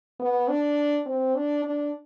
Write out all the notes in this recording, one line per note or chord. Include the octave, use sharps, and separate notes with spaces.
B3
D4
C4
D4
D4